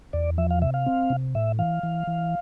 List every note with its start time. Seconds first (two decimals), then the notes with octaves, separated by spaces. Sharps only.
0.13 E2 D5
0.38 F3 E5
0.50 F5
0.62 C3 E5
0.74 F5
0.86 C4
1.10 C3
1.35 A2 E5
1.59 E3 F5
1.83 E3
2.07 E3